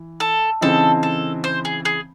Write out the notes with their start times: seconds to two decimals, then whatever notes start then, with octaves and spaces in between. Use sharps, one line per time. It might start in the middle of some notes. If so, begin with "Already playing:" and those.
Already playing: E3
0.20 A4
0.61 C#3 E3 C4 D#4 A4
1.03 A4
1.44 C5
1.65 G#4
1.85 G#4